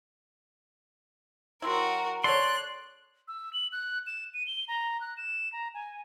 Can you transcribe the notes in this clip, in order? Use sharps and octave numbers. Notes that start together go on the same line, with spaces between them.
F#3 C4 E4 F#4 A#4
A4 C#5 D5 C6 F#6
E6
F#7
F#6
E7
D#7
G7
A#5
F#6
E7
A#5
G#5